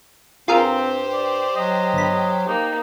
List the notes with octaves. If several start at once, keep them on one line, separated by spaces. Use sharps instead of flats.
G2 C4 F4 G4 G#4 A#4 C5
D5
F#3 D#5
G1 B5
A#3 D#4 G4